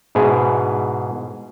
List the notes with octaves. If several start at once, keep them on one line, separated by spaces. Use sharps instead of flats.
G#2 B2 E4 G#4